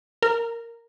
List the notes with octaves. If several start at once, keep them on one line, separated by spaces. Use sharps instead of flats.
A#4